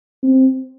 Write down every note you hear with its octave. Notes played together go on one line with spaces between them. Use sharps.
C4